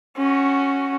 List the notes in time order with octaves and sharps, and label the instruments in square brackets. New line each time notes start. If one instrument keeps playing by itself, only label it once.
[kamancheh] C#4 F#4